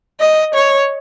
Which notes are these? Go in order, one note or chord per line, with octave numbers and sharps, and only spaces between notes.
D#5
C#5